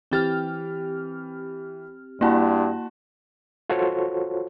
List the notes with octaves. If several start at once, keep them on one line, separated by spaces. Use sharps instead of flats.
E3 C4 G4 G5 F6 A6
G2 A#3 E4 F#4 A5 B5
F4 F#4 A4 C5 C#5